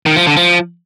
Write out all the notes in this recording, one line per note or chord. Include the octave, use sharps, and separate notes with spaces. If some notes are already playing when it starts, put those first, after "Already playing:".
D#3
F3
D3
F3